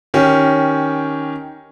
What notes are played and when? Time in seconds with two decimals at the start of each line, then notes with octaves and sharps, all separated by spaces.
0.14 D#3 C#4 G4